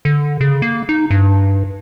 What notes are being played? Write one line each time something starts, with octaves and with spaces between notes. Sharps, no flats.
D3
C#3
A#3
D#4
G2